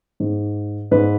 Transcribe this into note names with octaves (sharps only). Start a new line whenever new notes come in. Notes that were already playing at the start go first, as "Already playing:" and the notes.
G#2
G#2 B4